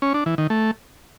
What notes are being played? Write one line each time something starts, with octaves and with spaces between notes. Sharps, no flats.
C#4
D4
E3
D#3
A3